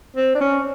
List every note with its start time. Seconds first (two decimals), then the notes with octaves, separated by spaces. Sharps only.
0.17 C4
0.35 D4
0.41 C#4